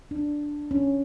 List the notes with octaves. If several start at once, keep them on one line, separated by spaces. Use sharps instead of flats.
D4
C#4